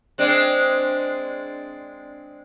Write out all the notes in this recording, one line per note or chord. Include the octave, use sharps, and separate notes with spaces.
G#3 C4 D4